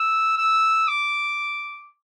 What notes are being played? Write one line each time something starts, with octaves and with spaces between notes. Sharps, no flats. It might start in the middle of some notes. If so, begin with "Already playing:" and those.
Already playing: E6
E6
D6